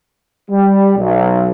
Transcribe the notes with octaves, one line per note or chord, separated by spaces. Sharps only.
G3
B1